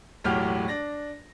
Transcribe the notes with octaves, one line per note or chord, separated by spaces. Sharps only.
E1 B1 A2 F#4 G4 F6
D4 A#6